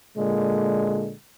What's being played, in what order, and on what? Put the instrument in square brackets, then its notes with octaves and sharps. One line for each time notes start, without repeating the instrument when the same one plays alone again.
[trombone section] A#2 D3 G#3